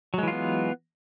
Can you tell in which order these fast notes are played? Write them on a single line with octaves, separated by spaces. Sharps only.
F#3 G#3 E3 F4 B3